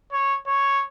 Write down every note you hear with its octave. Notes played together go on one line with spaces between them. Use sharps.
C#5
C#5